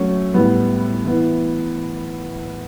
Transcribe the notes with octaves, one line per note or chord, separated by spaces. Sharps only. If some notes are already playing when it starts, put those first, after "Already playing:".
Already playing: F#3 A3 C#4
A2 G3 B3
E3 B3 E4